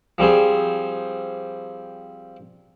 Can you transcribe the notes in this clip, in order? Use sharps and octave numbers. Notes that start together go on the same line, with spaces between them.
F3 G3 C4 G#4